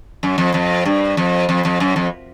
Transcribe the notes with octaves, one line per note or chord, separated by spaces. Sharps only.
F#2
F2
F2
G2
F2
F2
F2
F#2
F2